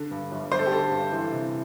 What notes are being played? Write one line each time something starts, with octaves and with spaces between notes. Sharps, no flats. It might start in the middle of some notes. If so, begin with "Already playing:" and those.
Already playing: D3
G2
G1
G1 C5
A4
G4
D3 A4
G2
E3
C3